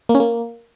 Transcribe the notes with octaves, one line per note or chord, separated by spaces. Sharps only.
A#3
C#4
A#3